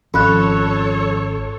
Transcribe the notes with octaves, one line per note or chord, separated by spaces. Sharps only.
G#1 F2 F3 C#4 A4 C#5 B5 F#6